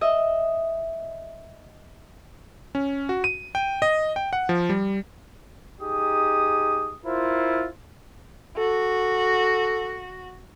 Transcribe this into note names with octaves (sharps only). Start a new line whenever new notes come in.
D#5 E5
C#4
F#4
D#7
G5
D#5
G5
F#5
F3
G3
D#4 G4 G#4 D#6
E4 F4 A#4 C5
F#4 A4